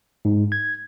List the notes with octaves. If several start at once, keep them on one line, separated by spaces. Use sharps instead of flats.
G#2
G#6